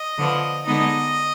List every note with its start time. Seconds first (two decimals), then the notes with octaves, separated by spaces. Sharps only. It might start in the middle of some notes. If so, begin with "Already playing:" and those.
Already playing: D#5
0.18 D3 F3 B3
0.66 D3 G#3 B3 D#4 D#5